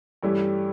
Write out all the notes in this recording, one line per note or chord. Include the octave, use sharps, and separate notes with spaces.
G2 E3 G3 A3 C#4 E4